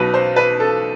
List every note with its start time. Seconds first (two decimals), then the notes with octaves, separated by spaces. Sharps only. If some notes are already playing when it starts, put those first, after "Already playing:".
Already playing: B1 B2 B4
0.14 C5
0.36 B4
0.60 A4